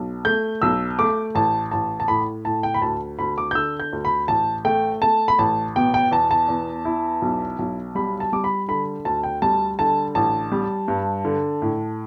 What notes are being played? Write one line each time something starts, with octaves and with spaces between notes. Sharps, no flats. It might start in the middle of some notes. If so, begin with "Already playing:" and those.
Already playing: B1
A3 G6
B1 E6
A3 D6
A1 A5
A1 A5
A5
A2 B5
A2 A5
G5
B5
D2 A5
D2 B5
D6
G6
D3 E6
G6
D2
B5
A1 A5
A3 G5
A3 A5
B5
A1 A5
B2 G5
G5
E2 A5
A5
E2
E4
B1
B1
G3 B5
A5
G3 D6
B5
D3 B5
D2 A5
G5
G3 A5
D3 A5
A1 A5
G3
G2
D3
A2